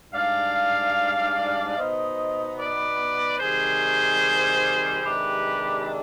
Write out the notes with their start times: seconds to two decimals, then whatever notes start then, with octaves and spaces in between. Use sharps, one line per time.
0.13 G#2 G3 D4 D5 F5
1.76 B2 B3 D#4 C5 D#5
2.58 B4 D5
3.40 C3 D#3 G3 G#4 C5
5.03 C3 D#3 G#3 D4 G4 B4